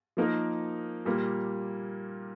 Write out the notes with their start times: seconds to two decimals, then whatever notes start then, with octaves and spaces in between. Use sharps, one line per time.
0.17 F3 A#3 D#4 A#4
1.05 A#2 G3 A#3